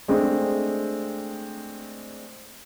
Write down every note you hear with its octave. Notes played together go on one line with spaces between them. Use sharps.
G#3 A3 C4 D4